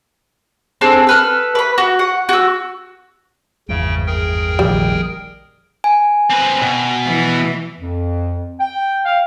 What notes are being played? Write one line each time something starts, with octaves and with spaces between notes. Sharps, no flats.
C4 D4 G#4 A4
A4 B4 F6
B4 B5
F#4
F#5
F#4 E6
G#1 E2 G2 C#3 G5
G#4 A#4 G5
F1 A#1 C3 D#3 G3
G#5
C4 B4
B2
E3
F2
G5
F5